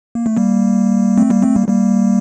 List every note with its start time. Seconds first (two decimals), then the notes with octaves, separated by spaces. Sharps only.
0.15 A#3
0.26 A3
0.37 G3 A#3
1.18 A3 C4
1.30 G3 A#3
1.43 A3 C4
1.56 G3 A#3
1.68 G3 A#3